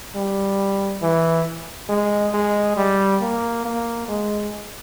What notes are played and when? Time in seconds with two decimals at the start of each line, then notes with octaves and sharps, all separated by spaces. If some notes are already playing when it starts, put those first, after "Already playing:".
0.15 G3
1.02 E3
1.89 G#3
2.34 G#3
2.77 G3
3.22 A#3
3.65 A#3
4.08 G#3